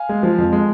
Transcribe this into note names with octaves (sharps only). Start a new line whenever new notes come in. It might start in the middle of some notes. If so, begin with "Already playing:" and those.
Already playing: F5 G#5
G#3
F3
F2
G#3